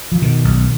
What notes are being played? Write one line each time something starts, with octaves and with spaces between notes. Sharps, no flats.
F3
B2 D#3
B1